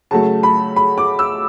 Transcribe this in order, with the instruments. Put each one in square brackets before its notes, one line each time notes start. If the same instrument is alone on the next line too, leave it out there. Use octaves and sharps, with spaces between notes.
[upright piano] C#3 F#3 A3 A5
B5
B5
D6
E6